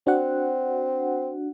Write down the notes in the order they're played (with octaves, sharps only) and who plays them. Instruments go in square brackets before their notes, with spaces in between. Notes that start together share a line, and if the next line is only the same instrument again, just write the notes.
[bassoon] C4 [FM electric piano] D4 F#4 F#5